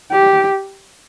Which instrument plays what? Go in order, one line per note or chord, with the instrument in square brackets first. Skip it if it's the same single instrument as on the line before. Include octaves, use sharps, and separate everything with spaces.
[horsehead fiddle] G4